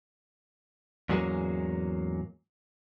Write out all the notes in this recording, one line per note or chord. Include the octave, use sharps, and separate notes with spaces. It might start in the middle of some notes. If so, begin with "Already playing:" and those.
E2 G#2 F#3 G#3 A#3 C#4